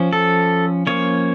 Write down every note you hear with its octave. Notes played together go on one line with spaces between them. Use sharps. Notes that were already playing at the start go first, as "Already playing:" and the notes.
Already playing: F3 C#4
A4
F3 A#3 C#4 C#5